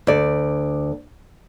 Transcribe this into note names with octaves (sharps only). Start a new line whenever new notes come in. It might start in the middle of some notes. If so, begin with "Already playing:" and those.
D2 D5